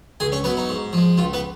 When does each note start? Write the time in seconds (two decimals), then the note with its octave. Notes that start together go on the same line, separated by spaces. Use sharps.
0.20 C#2 G#4 G#5
0.32 C#4 C#5
0.44 F#3 B3 B4
0.47 B2
0.57 D#4
0.69 G#2
0.93 F3 G#3
1.17 C#2 F4
1.33 B3 B4